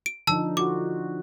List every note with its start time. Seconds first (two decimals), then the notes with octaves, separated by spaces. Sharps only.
0.06 D7
0.27 D3 F3 D#4 A5 E6
0.57 F4 F#4 D6